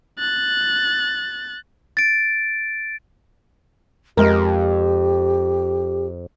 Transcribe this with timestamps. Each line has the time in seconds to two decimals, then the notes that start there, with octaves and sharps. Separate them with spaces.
0.19 F#6 A6
1.97 A6 D7
4.17 F2 G#3 G4 A#4